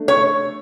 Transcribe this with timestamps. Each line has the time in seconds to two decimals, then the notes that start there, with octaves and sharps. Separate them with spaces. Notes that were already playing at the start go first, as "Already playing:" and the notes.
Already playing: A3 D4
0.08 C#5